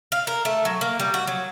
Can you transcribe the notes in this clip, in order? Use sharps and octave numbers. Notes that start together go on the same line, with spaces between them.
F5
A#4
A3
F#3
A#3
G3
F#4
F#3